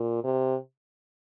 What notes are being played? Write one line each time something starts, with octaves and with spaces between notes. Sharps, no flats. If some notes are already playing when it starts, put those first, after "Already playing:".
Already playing: A#2
C3